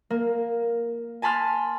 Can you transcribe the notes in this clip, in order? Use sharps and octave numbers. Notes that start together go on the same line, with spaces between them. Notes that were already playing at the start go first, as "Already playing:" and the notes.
A#3
G#5 A5 B5 C6 F6